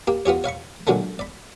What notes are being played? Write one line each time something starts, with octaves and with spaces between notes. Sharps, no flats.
A#3 G4
B3 F4 G4 C#5
C#5 F5 B5 C#6
A#2 D3 F#3 G#3 A3
D5 B5